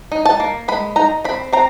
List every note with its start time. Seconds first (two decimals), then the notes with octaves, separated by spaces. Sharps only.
0.12 D#4
0.25 A5
0.40 A#3
0.68 G#3 B5
0.96 D#4 A#5
1.24 C4 B5
1.53 C4 A#5